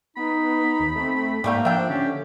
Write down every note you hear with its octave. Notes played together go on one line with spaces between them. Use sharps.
B3 D#4 B5
D#2
A3 C4
G#2 G3 A3 A#3 G5
F3 D4 E5 G5
D3 C#4 G4